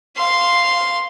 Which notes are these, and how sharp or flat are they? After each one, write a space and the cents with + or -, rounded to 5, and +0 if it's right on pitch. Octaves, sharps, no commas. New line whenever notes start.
F5 +0 C6 +0